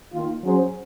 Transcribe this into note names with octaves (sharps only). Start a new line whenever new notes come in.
D#3 A#3 F4
F#3 C#4 G#4 C5